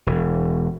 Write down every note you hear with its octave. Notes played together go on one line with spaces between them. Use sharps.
E1